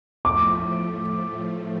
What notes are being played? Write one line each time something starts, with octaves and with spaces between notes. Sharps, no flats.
A2 F3 A3 D6